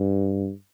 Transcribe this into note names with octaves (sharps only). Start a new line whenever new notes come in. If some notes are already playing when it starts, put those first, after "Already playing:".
Already playing: G2